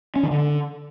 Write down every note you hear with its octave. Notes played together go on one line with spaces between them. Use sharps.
C#4
D#3
D3